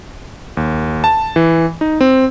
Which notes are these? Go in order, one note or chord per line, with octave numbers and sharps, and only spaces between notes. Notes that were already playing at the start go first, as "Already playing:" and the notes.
D#2
A5
E3
D#4
C4